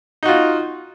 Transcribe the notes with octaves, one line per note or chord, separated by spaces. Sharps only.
D#4 F4 F#4